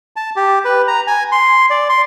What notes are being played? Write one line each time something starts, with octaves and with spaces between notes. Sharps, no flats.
A5
G4
B4
A#5
G#5
C6
D5
C6